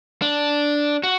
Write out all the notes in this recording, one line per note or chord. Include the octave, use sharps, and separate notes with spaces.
D4
F#4